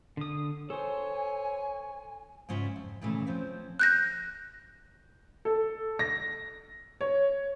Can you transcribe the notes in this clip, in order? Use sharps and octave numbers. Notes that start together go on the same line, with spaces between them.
D3 D#6
A4 C5 C#5 G#5
G#2 C#3 C#4 F4 D5 E5
F2
D#2 A#2 C#3 E3 A3
F3 C4 C#4
F#6 G6 A#6
A4
A#6
C#5